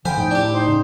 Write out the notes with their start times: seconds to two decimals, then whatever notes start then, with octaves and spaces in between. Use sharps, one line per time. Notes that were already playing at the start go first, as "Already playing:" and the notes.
0.05 D3 F3 C5 G5 G#5 B5
0.17 A2 D#4 G5
0.31 D4 E4 G4
0.53 D#4 C5
0.67 C#3